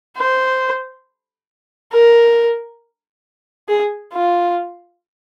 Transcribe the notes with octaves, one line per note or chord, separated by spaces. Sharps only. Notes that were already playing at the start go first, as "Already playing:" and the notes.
C5
A#4
G#4
F4